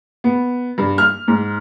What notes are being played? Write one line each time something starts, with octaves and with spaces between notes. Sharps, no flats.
B3
G2
F6
G#2